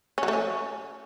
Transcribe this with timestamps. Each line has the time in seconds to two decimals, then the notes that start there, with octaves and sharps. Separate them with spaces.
0.18 C#4
0.23 F#3
0.28 A3
0.33 C#4